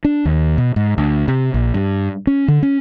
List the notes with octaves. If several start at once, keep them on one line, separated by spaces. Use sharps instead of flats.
D4
D#2
B2
G#2
D2
C3
A#1
G2
C#4
D3
C#4